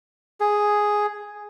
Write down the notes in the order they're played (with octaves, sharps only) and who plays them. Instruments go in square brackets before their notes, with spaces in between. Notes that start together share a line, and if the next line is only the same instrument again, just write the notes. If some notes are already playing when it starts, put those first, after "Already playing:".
[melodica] G#4